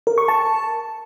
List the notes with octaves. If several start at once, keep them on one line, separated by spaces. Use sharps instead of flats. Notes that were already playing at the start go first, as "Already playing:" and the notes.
A#4
C#6
A5